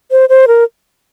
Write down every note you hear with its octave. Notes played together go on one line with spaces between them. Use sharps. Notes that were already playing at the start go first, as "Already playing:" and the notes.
C5
C5
A#4